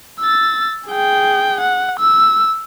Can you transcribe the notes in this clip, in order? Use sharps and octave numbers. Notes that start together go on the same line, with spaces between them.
E6 A6
G#4 G5
F#5
E6